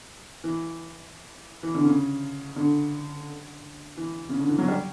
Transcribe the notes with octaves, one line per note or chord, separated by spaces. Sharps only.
E3
E3
D3
C#3
D3
E3
C#3
D3
E3
F#3
G3